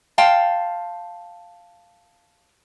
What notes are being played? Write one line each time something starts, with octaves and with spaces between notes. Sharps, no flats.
F5 G5 A5 C6